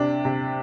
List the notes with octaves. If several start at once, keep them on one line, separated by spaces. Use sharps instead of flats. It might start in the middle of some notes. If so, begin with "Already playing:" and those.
Already playing: C3 D4
C3